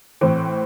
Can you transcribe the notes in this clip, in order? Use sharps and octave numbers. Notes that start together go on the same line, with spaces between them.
A2 E3 C4